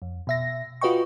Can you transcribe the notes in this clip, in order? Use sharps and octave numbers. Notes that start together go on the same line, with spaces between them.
F2
B2 E5 A#6
F4 F#4 B4 D#5 G5 C#6